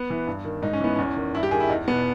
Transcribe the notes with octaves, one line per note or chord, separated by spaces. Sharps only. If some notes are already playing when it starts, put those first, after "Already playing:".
Already playing: B3
E3
G2
D#3
G#2 D#4
C#4
E3 B3
E2 C#4
D#3
G2 E4
G4
D#3 G#4
E4
E2 D#4
B2 B3